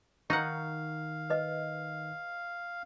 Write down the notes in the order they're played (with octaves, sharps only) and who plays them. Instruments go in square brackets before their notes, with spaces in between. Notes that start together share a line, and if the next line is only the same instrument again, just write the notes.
[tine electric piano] D#3 [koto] D#4 F#5 [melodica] F5 [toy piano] C#6
[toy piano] B4 D#5